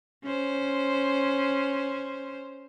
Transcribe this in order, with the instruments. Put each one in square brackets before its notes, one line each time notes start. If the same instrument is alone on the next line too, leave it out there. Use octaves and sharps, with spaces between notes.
[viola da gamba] C#4 C5